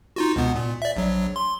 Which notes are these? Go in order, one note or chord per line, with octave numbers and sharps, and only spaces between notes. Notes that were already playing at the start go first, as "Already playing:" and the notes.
D#4 F4 F#4
C#2 B2 B3
A#2
D5 E5
A#1 F#3
C6